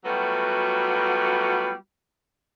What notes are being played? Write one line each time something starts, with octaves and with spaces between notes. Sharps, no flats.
F#3 G3 A3 B3 F4 F#4